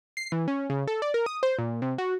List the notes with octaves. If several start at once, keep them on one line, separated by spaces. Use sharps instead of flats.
C7
E3
C#4
C#3
A4
D5
A#4
D#6
C5
A#2
C3
F#4